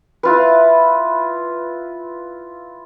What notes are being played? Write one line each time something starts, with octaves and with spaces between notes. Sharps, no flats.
E4 F4 B4